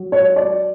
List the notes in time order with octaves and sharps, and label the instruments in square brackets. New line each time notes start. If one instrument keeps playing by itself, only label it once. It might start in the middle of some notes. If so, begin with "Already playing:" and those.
Already playing: [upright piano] F#3
C#5
D5